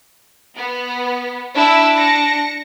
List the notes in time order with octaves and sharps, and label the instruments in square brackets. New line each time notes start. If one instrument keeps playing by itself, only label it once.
[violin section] B3
[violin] D4 [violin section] E4 E6
[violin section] A#6 C#7